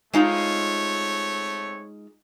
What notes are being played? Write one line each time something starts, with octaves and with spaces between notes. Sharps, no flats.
G#3 A3 C4 D#4 F4 C#5